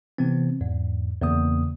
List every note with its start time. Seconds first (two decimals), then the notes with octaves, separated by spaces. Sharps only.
0.18 C3 E3 B3 C4
0.61 E2 G#2
1.22 E2 C#3 A#3 D#6